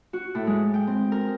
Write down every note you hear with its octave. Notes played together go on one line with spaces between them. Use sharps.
F#4
A2
G#3
G5
C4
A#4